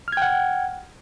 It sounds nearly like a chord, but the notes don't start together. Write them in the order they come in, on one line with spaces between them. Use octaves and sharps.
F6 G#6 G5 F#5